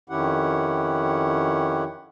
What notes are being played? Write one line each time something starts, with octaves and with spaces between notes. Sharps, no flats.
F2 D#3 C#4 E4 G4 F#5